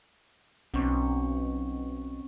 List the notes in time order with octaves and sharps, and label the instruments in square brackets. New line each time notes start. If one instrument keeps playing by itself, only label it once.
[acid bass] B1 [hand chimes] C4 C#4 C#6